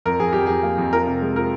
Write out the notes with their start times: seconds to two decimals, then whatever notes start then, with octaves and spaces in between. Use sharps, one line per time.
0.06 F2 A#4
0.20 F2 G#4
0.33 F2 G4
0.46 F2 G#4
0.63 A#3
0.78 F2
0.92 F3 A#4
1.07 C3
1.22 G#3
1.36 F3 A#4